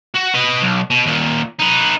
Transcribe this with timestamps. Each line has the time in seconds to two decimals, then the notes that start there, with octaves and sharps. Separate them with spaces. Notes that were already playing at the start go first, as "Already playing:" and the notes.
0.15 F#4
0.35 B4 D#5
0.63 B1
0.90 B2
1.06 D#2 A#2
1.59 D#4 B4